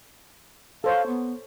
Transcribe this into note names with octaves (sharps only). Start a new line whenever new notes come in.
A4 C5 C#5 F5
B3